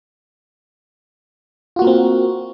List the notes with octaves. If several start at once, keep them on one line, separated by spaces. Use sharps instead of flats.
A#3 C4 F4 F#4 A#4